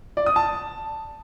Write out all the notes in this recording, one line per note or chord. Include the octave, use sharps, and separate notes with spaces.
D5
D#6
A5